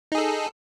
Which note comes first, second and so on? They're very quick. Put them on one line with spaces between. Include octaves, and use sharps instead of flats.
D#4 G#4 A4